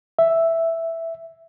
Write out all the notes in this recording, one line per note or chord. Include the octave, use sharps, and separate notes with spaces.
E5